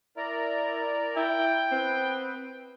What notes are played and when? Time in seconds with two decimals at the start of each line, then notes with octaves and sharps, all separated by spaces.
0.17 E4 A#4 D5 A#5
1.16 E4 G5
1.72 B3 C4 B4